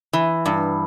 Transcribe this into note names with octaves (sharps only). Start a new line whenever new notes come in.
E3
G2